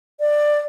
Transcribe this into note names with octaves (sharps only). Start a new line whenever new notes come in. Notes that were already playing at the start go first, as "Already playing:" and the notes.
D5